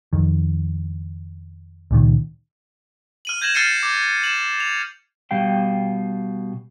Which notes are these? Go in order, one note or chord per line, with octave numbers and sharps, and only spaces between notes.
F2 D#3
C#2 A#2 D#3
F6 D#7 F#7
G6 G#6 A#6 E7 F#7
F6 A6 C7 C#7 D#7
D6 G6
E7 F#7
F7
B2 G3 F5 G5